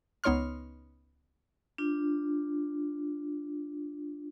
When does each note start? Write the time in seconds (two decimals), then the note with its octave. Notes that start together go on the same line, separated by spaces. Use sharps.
0.24 C#2 B3 D#4 C#5 C6 F6
1.78 D4 F4